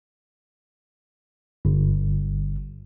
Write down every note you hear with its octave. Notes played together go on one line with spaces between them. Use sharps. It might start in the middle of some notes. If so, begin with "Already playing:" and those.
G1